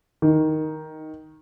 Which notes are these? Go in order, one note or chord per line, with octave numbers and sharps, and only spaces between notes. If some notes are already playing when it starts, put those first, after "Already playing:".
D#3